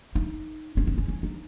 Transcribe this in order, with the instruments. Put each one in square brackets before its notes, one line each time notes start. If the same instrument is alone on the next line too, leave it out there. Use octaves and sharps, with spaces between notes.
[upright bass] D#4
C#4
C4
C#4
C#4
D#4